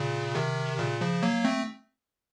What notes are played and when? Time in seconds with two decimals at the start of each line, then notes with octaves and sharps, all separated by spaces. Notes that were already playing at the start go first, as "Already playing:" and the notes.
Already playing: A#2 C#3
0.35 C3 D#3
0.79 A#2 C#3
1.01 C#3 F3
1.23 F#3 A#3
1.44 A3 C4